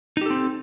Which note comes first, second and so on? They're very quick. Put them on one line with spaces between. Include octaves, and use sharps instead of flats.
D#4 G4 A4 C4